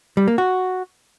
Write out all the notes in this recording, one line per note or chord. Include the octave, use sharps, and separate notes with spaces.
G3
A#3
F#4